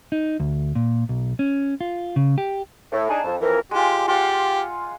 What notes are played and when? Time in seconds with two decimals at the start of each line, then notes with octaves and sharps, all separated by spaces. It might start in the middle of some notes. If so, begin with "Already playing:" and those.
0.12 D#4
0.40 D2
0.75 A#2
1.09 B1
1.39 C#4
1.81 F4
2.16 C#3
2.38 G4
2.92 A2
3.09 D4 D#4 G#4 A5
3.24 F2
3.41 F2 E3 A#4
3.71 G#3 F4 G4
4.08 F4 G4 F#5